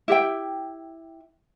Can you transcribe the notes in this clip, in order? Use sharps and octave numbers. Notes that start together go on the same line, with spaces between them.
E4 G4 E5 G5